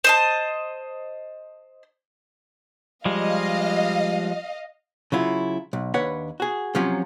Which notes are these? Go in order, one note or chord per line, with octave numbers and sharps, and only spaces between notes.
C5 D#5 A5
F3 G3 G#3 D#5 F5
C#3 F#3 E4 F4
B1
D#2 D4 B4 C#5 F#5
F#4 G#4
C3 F3 F#3 C#4 F4